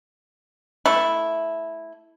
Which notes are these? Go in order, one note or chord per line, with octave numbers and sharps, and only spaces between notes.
A3 E4